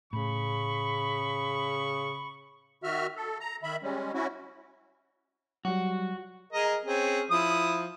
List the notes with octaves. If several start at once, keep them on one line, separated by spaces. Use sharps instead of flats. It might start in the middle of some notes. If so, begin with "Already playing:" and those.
A2 C#3 B5 C#6
D#3 F#4 E5 F6
A4
A#5
D#3 E5 B5
G3 G#3 C#4
C#4 E4 F#4
F#3 G3 F#4
G#4 A#4 D#5
C4 C#4 G#4
F3 E4 D#6